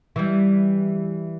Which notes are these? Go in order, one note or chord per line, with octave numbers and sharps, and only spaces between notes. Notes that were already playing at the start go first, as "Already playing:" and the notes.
E3 G3